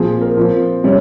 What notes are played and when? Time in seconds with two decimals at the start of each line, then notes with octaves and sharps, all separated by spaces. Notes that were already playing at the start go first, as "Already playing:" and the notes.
Already playing: A#2 F3 C4 G#4
0.21 A#4
0.37 F3 C4
0.84 C3 G3 C#4